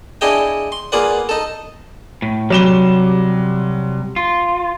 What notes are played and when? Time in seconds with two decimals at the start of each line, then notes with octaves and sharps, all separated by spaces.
0.21 D4 E4 G#4 D#5 G5
0.72 C6
0.92 A#3 F4 G#4 B4 D5 F#5
1.29 D#4 A4
2.22 A2
2.50 C3 F#3 G3 E7 G7
4.16 F4